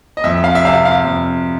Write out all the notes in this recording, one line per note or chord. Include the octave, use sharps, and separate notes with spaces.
D#5
F2 E5
F5
E5
C3 F5
F5
F2